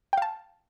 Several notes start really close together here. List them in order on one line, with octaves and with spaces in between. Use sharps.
G5 F5 A5